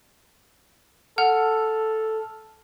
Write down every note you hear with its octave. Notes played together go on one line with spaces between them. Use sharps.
A4 F#5 F6